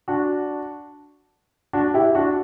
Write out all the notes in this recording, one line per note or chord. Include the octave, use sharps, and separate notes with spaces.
D4 F#4
D4 F#4
E4 G4
D4 F#4